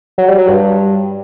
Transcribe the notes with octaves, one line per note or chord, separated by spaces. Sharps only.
F#3
G3
F#3
G2